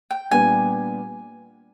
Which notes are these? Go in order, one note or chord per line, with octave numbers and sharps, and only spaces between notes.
G5
A#2 G3 B3 D4 G4 G#5